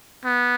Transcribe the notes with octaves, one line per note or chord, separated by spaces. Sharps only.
B3